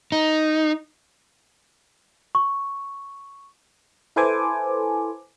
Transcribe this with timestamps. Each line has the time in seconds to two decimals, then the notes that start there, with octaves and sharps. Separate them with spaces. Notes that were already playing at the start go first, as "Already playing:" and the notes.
0.12 D#4
2.35 C#6
4.16 E4 A4 B4 C5 G#5 D6